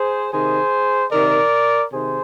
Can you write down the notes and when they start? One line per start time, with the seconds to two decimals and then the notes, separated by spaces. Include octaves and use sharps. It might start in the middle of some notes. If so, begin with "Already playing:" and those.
Already playing: G#4 C5
0.32 C3 D#3 G#4 C5
1.11 C3 D#3 A#4 D5
1.91 C3 D#3 G#4 C5